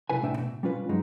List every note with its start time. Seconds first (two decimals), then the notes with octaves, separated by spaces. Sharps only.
0.10 C2 F#2 C3 E4 B4 G#5
0.22 C2 A2 D4 E5 G5
0.38 B2
0.63 G3 C#4 F4 B4
0.89 G2 F#3 G#3 D#4